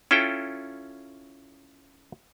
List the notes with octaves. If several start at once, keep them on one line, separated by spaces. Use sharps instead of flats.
C#4 E4 F4 A4 G5